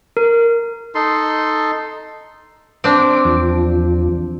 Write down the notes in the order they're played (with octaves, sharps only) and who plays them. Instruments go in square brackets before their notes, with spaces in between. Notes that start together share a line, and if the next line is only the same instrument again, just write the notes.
[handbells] A#4
[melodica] D#4 A4 C6
[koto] C4 D4 [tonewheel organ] D6
[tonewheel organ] E2 F3